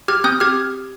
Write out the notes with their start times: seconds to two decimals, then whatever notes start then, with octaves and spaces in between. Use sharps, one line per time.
0.08 G4 F6 G#6
0.24 C4 D#6 G6
0.40 G4 F6 G#6